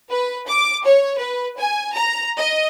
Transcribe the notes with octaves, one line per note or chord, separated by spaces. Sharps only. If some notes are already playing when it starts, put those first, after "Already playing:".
B4
D6
C#5
B4
G#5
A#5
D#5